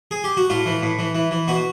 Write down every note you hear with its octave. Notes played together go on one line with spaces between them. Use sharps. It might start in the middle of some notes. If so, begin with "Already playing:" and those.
G#4
G4
F#4
A2 F4
E3
A2
E3
E3
E3
B2 F#4